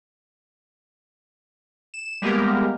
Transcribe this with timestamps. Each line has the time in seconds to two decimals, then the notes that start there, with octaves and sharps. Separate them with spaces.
1.94 E7
2.22 G3 G#3 A#3 B3 G4 A#4